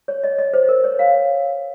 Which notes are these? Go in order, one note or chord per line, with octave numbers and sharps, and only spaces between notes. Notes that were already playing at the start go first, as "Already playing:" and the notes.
C#5
D#5
D#5
C5
A#4
C#5
F5